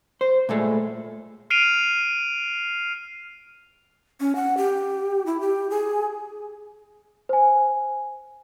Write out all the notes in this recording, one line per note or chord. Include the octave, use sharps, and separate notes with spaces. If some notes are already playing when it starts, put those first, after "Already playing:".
C5
A#2 G#3 A3
F6 C7 D7 D#7 F7
C#4
F#5
G4
E4
G4
G#4
C5 G#5